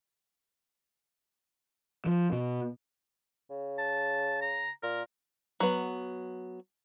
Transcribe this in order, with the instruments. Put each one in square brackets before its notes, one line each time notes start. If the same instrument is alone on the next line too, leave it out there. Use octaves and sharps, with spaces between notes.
[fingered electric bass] F3
B2
[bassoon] C#3
[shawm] A5
A#5
[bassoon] A#2 [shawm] A#4
[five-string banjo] F#3 B3